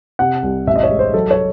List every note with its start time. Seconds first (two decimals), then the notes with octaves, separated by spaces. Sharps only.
0.19 C3 F#5
0.43 C2
0.67 A1 E5
0.76 D#5
0.83 C#5
0.90 G#3
0.99 C5
1.14 F#3 A4
1.31 C#5